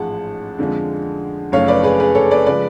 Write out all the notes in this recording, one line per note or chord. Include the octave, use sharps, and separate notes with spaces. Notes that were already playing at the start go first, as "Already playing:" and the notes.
Already playing: A1 G#2 F3 G#3 F#5 A5
F2 D3 F3 G#3
F#1 F#2 F3 A3 C#5 F5
B4 D5
G#4 B4
G#4 B4
A4 C#5
B4 D5
C#3 F3 G#3 B4 D5